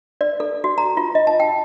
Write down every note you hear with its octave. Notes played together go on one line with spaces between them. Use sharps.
D5
A4
F#4
A#5
F4
D#5
A5
G5